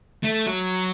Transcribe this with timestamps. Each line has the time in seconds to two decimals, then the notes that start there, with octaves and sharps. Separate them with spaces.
0.24 A3
0.47 F#3